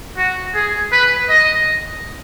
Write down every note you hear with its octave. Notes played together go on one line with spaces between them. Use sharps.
F#4
G#4
B4
D#5